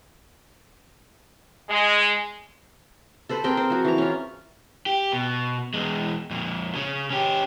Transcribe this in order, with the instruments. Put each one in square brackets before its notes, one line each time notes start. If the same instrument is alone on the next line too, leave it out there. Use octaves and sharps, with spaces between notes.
[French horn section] G#3
[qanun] A4 B4 C5
C4 G#4 A#4 G5
C5
F3 F#4
E3 A#5
C#4 F4
[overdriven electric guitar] G4
B2
E2 G#3
F2 A#2
C#3 C#4
C#4 G4